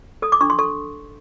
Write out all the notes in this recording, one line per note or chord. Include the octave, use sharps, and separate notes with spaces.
A4 D#6
D6
D4 C#6
C6
A4 C#6